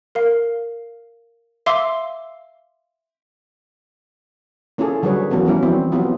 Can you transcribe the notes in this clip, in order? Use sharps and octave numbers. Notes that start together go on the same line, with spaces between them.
A#4 F5
E5 F5 C6 D6 E6
A#3 C#4 E4 F4 G#4 A4
D3 F#3 G3 G#4 B4 C#5
E3 F#3 A#3 B3 C#4
F3 G3 B3 C#4 E4
E3 F#3 C4
F#3 B3 E4 F4 G4